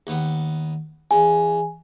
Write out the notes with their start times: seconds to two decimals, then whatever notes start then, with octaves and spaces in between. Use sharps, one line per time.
0.07 D#2 B3
1.11 E2 G#5